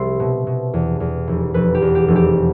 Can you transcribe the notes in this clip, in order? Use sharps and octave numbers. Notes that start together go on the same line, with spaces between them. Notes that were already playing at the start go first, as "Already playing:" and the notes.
Already playing: C2 G3 C5 E5
B2
B2
E2
E2
F1
F1 B4
G4
E2
G4
F1
G4